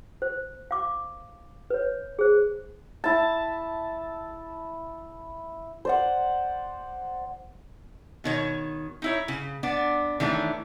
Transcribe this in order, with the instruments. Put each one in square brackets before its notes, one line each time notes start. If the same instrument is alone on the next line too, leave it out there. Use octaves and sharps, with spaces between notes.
[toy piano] C5
F5 D6
B4 C#5
G#4 C5
[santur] E4 A5
C5 D5 F#5
[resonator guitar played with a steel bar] B2 D#3 C#5
D#4 E4 C#5
C#3
B3 D4 D5
D#3 E3 A3 C#4 D4